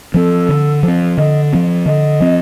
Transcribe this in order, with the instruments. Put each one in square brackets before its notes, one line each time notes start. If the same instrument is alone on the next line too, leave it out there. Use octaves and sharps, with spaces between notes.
[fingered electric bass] F3 C4 [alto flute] A4
[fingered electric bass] D3
F3
C4
[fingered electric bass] D3 [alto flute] D#5
[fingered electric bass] F3 C4
[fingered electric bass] D3 [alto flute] D#5
[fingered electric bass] F3 C4